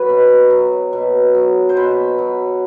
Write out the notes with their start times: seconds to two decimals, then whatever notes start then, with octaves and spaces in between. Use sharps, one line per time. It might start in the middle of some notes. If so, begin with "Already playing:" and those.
Already playing: F#3 B4 C#5
0.09 B2
0.50 F#3
0.93 B2
1.35 F#3
1.69 C5
1.77 B2 B4
2.19 F#3